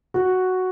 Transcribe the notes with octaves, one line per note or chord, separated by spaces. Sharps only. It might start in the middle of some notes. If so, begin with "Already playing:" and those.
F#4